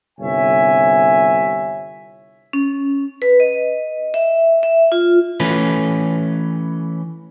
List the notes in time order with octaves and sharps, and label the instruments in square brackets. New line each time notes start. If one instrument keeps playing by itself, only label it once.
[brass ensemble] G1 C2 C#5 E5 G#5
[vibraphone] C#4
B4
D#5
E5
E5
F4
[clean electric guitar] E3 A3 C#4 B4